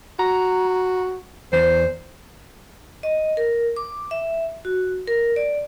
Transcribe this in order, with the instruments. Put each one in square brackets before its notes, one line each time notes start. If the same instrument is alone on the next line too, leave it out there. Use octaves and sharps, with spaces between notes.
[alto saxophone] F#4 [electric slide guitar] A#5
[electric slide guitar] E2 [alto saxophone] C5
[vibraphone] D#5
A#4
D6
E5
F#4
A#4
D5